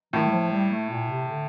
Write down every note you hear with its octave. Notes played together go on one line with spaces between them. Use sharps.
A2 D#3
G3
F3
G3
A3
A#2
C3
D3